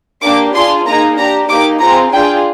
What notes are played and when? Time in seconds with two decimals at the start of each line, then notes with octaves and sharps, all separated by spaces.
0.22 A#3 D4 G4 D6
0.54 D4 F4 G#4 C6
0.86 A#3 D#4 G#4 A#5
1.17 D4 G4 A#5
1.49 A#3 D#4 G4 D6
1.80 C4 F4 G#4 A#5
2.13 D4 F4 G#4 G5